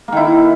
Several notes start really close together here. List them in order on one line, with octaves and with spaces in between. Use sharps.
A#3 D#3 E4